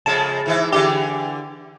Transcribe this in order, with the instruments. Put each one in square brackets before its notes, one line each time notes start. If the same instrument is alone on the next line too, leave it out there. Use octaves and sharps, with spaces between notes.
[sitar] F2 C#3 G#3 [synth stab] A5
[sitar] G#2 E3 E4
[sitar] D3 E3 D4 [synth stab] G4